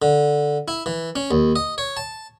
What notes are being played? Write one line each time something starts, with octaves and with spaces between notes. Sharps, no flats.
D3
E4
E3
C#4
D#2
D#5
C#5
A5